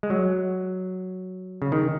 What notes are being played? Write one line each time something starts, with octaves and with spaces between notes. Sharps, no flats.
G#3
F#3
C#3
D#3